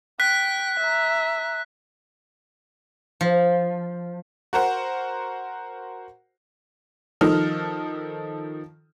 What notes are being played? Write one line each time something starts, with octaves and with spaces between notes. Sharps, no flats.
G5 F#6 B6
E5 A#5
F3
F#4 A#4 C5 F#5
D#3 F3 D#4 A4 F6